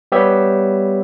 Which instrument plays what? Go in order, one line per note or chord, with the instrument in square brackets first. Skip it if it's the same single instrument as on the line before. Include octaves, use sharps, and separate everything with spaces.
[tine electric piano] G3 B3 G4 C#5 E5